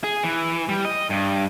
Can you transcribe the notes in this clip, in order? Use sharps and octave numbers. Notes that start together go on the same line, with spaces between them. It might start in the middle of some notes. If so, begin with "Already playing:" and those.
G#4
E3
G3
D#5
G2